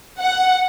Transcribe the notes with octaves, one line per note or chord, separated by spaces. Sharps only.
F#5